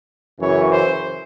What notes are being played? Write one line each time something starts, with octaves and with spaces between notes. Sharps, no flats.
F#2 C#3 E3 C#5
C5